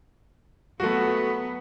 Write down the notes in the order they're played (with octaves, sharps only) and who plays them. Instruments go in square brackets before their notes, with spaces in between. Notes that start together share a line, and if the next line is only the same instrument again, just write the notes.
[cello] F#3 B3 [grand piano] A3 F#4